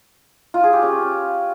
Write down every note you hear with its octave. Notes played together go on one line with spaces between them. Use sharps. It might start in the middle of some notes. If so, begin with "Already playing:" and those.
F4
G#4
G4
C#4